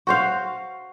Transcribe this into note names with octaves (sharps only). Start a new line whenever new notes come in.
F#4 C5 F5